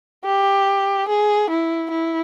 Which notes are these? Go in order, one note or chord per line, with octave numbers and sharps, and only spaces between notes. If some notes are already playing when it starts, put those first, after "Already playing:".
G4
G#4
E4
E4